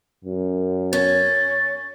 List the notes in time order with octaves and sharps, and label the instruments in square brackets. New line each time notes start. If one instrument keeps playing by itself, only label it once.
[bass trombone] F#2
[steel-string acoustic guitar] C#4 [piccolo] A6